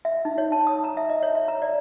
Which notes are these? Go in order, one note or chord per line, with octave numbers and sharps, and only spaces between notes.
E5
D#4
C#5
A5
D#6
A#5
E5
D#5
C#5
E5
A#5
D5